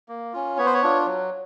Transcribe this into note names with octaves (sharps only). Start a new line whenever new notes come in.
A#3
C#4 F4
B3 C#5
C5
C#5
D4 F4
F#3